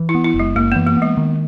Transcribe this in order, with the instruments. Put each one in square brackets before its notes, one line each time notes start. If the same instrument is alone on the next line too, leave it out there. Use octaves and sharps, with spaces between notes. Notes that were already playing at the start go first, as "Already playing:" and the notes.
Already playing: [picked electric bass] E3
[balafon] E4
[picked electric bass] B3
[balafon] E4
[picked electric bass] F#1
[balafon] G#3
[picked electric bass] F#2 [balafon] A#3
[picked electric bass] E3 [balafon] B3
[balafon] A#3
[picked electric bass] B3
[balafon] G#3
[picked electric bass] D#3